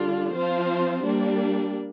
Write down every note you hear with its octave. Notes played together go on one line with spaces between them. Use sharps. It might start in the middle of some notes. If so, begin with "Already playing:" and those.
Already playing: D3 G3 D4 F4
F3 C4 F4 C5
G3 A#3 D4